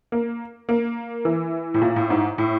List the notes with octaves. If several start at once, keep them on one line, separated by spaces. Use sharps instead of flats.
A#3
A#3
E3
A2
A#2
A2
G#2
A2